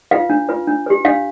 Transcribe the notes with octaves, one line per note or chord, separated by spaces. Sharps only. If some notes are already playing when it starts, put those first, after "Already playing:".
F4 B4 F5
D4
F4 B4
D4
G4 B4
D4 F5